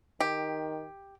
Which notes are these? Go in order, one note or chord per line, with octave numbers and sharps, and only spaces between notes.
D#3 G4